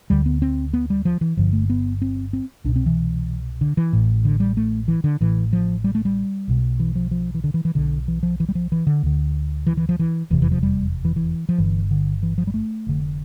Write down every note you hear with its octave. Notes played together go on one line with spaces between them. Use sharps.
D2 D3 G3
B3
C4
B3
G3
F3
E3
G1 G2 D3 F3
A3
B3
C4
C4
C2 B2 D4
C4
E3
D3
E3
A1 A2
D3
G3
A3
E3
D3
A1 A2 E3
F3
G3
A3
G3
B1 B2
E3
F3
F3
E3
D3
E3
E3
B1 B2 D3
E3
F3
E3
G3
F3
E3
D3
D2 D3
E3
E3
F3
E3
F1 E2 C3 E3
E3
F3
G3
E3
E3
F3
G1 G2 D3 E3
D3
E3
F3
G3
A3
F1 F2 D3